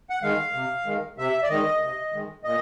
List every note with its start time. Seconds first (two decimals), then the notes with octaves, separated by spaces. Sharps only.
0.10 F#5
0.23 D#3 G#3 F5
0.54 C3
0.86 D#3 G#3
1.17 C3 E5
1.43 D5
1.49 D#3 G#3 D#5
1.81 C3
2.12 D#3 G#3
2.44 A#2 D#5